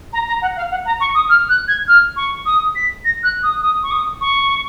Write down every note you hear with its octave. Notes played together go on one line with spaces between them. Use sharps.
A#5
A#5
F#5
F5
F#5
A#5
C#6
D#6
F6
F#6
G#6
F6
C#6
D#6
B6
A#6
F#6
D#6
D#6
C#6
D#6
C#6